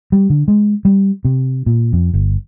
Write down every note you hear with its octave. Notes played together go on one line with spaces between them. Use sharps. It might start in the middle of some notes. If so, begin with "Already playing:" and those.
G3
D3
G#3
G3
C3
A#2
F2
G1